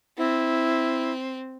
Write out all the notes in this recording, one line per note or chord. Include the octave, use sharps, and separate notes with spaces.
C4 E4